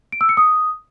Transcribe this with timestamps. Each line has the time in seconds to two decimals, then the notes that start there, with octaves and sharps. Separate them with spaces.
0.12 D7
0.21 E6
0.29 C#7
0.37 D#6